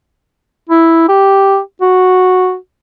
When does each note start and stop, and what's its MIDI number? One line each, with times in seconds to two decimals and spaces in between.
0.70 1.07 64
1.09 1.59 67
1.81 2.55 66